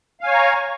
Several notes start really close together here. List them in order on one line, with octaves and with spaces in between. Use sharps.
F5 G#5 C#5 C#6 A#5